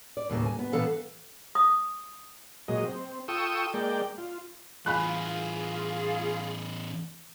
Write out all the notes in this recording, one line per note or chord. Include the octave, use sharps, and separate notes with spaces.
D5
D#2 A2 C#3 A#3
G#5
B3
A#2 E3 B3 A4 B4 F5
D#6
A#2 F#3 G#3 D#5
C4
F4 A4 G5 C#6 D#6 E6
G#3 A#3 D5 G5
F4
E2 A2 F4 G#4 G#5 B5 F#6